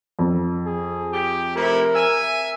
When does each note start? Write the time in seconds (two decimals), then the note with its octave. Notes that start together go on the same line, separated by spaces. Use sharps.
0.19 F2
0.66 G#4
1.13 G4
1.56 C3 A3 E4 A#4
1.95 E5 G#5